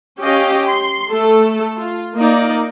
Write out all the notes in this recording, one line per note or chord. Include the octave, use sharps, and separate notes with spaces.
C#4 G4 D#5 F5
C6
A3 A4
F4
A#3 D#4 D5